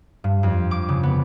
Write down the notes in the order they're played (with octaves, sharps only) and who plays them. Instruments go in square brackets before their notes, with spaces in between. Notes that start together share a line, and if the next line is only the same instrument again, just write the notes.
[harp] G2
F2
D6
C#3
B3